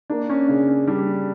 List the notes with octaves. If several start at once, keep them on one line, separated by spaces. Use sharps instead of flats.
A#3 D4
C#4
C#3 D4
C#4
G3 D4